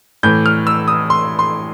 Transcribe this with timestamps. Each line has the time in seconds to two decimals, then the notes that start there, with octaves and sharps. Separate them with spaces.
0.23 A2 E3 G6
0.46 F6
0.67 E6
0.88 D#6
1.10 C6
1.39 C6